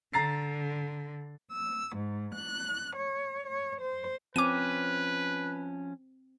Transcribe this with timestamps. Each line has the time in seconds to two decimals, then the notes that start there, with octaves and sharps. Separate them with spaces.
0.13 D3 A#5 A6 C7
1.51 E6
1.96 G#2
2.33 F#6
2.95 C#5
3.47 C#5
3.81 C5
4.36 F3 C4 C#4 B4 D6 D#7